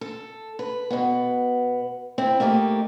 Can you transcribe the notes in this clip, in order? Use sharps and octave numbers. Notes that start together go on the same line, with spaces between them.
A4
B4
B2 B3
C4 E4
A3 A#3 D#4 G4